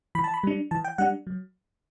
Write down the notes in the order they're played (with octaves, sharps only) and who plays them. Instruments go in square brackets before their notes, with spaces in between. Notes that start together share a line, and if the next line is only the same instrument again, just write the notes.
[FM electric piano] E3 B5
A5
B5
G3 D4
E3 A5
G5
G3 D4 F#5
F#3